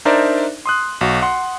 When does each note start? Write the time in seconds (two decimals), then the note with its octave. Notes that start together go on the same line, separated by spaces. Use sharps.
0.05 D4 D#4 A#4 C5 D5 E5
0.66 C6 D#6 F#6
1.01 B1 F#4
1.22 F#5 C6